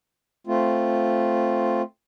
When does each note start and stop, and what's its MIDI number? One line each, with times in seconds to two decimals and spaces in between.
0.47 1.82 57
0.47 1.82 60
0.47 1.82 65